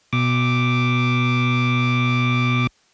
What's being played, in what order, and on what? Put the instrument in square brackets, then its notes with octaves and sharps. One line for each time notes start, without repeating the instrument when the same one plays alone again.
[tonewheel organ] B2 D6